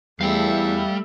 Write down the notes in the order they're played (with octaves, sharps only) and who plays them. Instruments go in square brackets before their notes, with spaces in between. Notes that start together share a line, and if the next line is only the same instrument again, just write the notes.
[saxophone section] E2 [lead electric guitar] G3 [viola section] A3 E5 [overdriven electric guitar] F5 G5